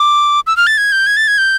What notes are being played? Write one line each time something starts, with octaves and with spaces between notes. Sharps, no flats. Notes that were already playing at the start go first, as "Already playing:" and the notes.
Already playing: D6
E6
F6
A6
G#6
G6
G#6
A6
G#6
G6